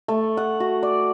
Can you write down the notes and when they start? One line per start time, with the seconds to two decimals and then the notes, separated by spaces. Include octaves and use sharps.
0.08 A3
0.37 F#5
0.60 F#4
0.83 D5